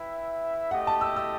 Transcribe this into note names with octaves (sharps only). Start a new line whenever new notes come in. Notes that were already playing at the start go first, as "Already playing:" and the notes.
Already playing: E4 B4 E5 G5
A3 E4 G4 D#5 F#5 G5
A5
E6
E6